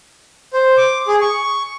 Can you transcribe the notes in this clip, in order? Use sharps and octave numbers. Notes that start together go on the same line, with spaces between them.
C5
D6
G#4
C#6